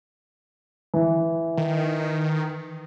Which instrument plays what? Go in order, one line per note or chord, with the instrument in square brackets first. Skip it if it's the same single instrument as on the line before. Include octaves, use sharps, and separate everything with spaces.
[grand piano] E3
[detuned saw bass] D#3